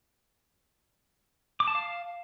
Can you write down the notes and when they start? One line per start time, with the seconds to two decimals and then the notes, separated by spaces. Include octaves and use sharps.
1.60 D6
1.68 A5
1.75 F5